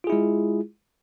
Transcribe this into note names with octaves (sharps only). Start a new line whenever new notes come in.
G#3 E4 F4 G#4